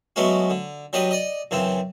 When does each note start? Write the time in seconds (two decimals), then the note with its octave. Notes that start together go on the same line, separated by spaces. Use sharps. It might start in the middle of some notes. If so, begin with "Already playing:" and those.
0.16 F#3 G#3 A3 B3 C#4 F#4
0.50 D3
0.93 F#3 G3 D4 B4 D#5
1.11 D5 D#5
1.51 F#2 C#3 E3 C4